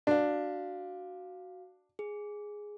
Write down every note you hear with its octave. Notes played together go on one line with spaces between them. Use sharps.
D4 F#4 F5
G#4